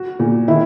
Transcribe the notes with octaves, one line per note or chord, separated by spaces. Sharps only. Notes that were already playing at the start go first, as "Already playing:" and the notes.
Already playing: F#4
A#2
D#3 E4